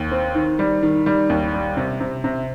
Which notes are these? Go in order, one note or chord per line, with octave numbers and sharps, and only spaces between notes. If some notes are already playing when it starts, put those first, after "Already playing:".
Already playing: D#2
C4
D#3
G3
D#3
G3
D#2
G3
C3
C3
C3